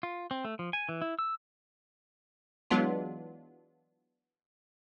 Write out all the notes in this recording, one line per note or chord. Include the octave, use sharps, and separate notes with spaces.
F4
C4
A3
F3
G#5
E3
E4
E6
E3 F#3 G#3 B3 D4 F4